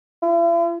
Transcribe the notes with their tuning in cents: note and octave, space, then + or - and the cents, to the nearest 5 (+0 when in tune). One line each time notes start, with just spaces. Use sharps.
E4 +45